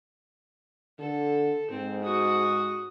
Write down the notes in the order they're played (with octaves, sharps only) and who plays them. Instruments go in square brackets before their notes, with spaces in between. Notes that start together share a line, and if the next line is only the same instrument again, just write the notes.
[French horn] D3 [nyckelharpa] A4
[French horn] G#2 [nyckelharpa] C4
[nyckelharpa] F#4 D#6